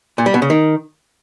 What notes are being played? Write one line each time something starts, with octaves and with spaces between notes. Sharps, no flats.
A#2
G3
B2
C#3
D#3